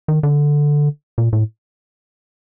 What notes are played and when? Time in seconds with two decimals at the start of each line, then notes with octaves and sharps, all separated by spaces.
0.08 D#3
0.23 D3
1.18 A#2
1.33 A2